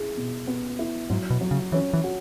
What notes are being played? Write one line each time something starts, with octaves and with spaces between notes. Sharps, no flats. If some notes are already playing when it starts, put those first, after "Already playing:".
Already playing: E4 G#4
B2
B3
E4
G#2 F#3
B2
F#3
C#3
E3 C#4
E3
F#4